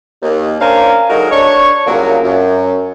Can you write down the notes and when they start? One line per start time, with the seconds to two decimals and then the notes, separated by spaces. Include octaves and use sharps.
0.23 D#2
0.60 C#4 D4 A#4 C5 F5 G#5
1.09 D3 F#3 G#3 D#4 F#4 A#4
1.30 D4 C#5 C#6
1.87 C2 A#2 C#3 F#3 A#3
2.24 F#2